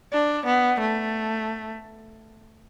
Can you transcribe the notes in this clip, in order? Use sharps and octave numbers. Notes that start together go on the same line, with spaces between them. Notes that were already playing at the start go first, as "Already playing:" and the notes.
D4
B3
A3